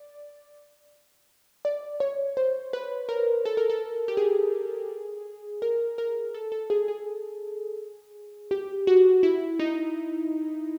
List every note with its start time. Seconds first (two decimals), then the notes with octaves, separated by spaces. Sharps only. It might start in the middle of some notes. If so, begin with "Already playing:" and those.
Already playing: D5
1.65 D5
2.00 C#5
2.37 C5
2.73 B4
3.09 A#4
3.45 A4
3.57 A#4
3.70 A4
4.08 G4
4.17 G#4
5.62 A#4
5.98 A#4
6.34 A4
6.52 A4
6.70 G#4
6.88 G#4
8.51 G4
8.87 F#4
9.23 E4
9.59 D#4